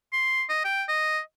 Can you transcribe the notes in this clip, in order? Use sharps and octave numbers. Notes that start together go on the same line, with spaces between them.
C6
D#5
G5
D#5